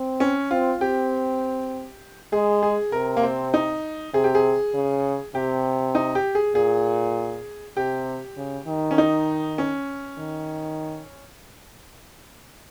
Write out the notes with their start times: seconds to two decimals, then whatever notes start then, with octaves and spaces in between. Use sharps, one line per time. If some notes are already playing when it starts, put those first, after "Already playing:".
Already playing: C4
0.20 C#4
0.51 C4 F4
0.81 C4 G4
2.32 G#3 G#4
2.63 G#4
2.92 C3 A#4
3.17 A#3
3.23 C4
3.54 D#4
4.14 C3 G#4
4.24 G4
4.35 G#4
4.74 C#3
5.35 C3 G4
5.95 D#4
6.15 G4
6.35 G#4
6.55 A#2 G#4
7.77 C3 G4
8.37 C#3
8.67 D#3
8.91 C#4
8.98 D#4
9.58 C#4
10.18 D#3